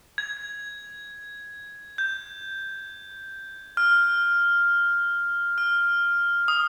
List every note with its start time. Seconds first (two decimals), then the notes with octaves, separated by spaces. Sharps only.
0.18 G#6
1.98 G6
3.77 F6
5.58 F6
6.48 D#6